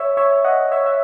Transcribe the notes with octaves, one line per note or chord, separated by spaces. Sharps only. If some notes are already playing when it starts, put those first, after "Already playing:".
Already playing: C#5 E5
C#5 E5
D#5 F#5
C#5 E5
E5